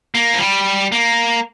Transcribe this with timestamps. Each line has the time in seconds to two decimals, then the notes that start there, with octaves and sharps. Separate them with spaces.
0.15 A#3
0.33 F3
0.40 G3
0.92 A#3